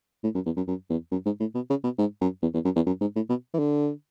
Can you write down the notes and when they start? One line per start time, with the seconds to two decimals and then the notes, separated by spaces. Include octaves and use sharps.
0.24 A2
0.34 F#2
0.46 E2
0.57 F#2
0.68 F#2
0.90 E2
1.11 F#2
1.26 G#2
1.40 A2
1.55 B2
1.70 C#3
1.84 B2
1.98 G#2
2.21 F#2
2.42 E2
2.54 E2
2.64 F#2
2.76 E2
2.86 F#2
3.01 G#2
3.16 A2
3.29 B2
3.54 E3
3.59 D3